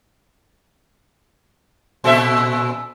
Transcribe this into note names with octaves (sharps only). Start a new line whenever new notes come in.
A#2 A4 E5